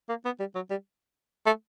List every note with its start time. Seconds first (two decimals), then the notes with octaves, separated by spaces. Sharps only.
0.09 A#3
0.25 B3
0.39 G3
0.55 F#3
0.70 G3
1.46 A3